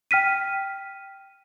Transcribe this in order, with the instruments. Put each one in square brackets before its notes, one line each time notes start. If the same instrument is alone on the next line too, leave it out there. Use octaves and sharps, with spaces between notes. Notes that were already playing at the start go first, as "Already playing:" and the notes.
[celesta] G5 F6 B6 D#7